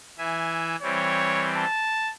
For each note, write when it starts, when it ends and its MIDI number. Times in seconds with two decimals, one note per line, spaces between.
0.18 0.76 52
0.18 0.76 76
0.18 0.76 80
0.82 1.65 52
0.82 1.65 55
0.82 1.65 60
0.82 1.49 73
1.57 2.12 81